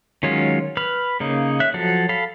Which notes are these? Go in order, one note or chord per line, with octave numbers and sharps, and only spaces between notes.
D#3 F#3 G#3 C#4 F4
B4 B5 F6
C#3 A#3 D#4
E5 F#6
F3 F#3 F#4 A4
A4 F5 B5